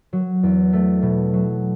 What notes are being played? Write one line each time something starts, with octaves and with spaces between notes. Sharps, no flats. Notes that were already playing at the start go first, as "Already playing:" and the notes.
F#3
E2
A3
B2
F#3